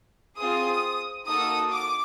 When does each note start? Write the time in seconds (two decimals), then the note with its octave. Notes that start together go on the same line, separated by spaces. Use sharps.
0.37 C4 F4 G#4 D#6
1.26 A#3 D#4 F#4 A4 D#6
1.71 D6